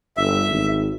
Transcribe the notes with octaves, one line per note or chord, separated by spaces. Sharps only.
G1 E5
G#1